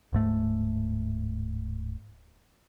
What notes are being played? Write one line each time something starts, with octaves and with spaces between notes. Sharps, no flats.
D1 G#2 A3